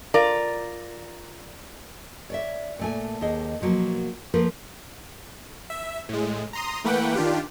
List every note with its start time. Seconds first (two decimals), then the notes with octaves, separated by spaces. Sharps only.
0.14 F4 A#4 D5
2.30 C#5 D5 E5
2.79 A#2 A3 G#5
3.21 D#2 G#4 D#5
3.61 B2 F3 F#3 A#3
4.34 F3 A3 A#3 A#4 B4
5.70 E5
6.09 A2 G#3
6.53 A#5 C6 D#6
6.84 E3 A3 A#3 B4 F#5 G5
7.15 D#3 D4 F4 G4